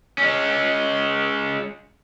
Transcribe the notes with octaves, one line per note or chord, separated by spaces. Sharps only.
G#3 C#4